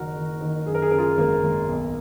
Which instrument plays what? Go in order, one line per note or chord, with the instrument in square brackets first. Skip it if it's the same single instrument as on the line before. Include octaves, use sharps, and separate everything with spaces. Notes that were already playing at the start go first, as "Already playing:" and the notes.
Already playing: [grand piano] F#1 D#3 F#4 A#4
D#3
D#3
F#2 G#4
A#4
G#4
C#3 A#4
F4 G#4
G#1 A#3
G#1
B1